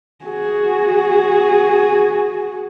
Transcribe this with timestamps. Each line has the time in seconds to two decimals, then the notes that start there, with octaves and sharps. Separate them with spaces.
0.25 F#4 G#4